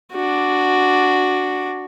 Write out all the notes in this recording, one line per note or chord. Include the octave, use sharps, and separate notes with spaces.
D4 F#4